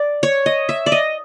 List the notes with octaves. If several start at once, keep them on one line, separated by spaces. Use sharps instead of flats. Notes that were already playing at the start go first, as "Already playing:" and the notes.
Already playing: D5
C#5
D#5
E5
D5
D#5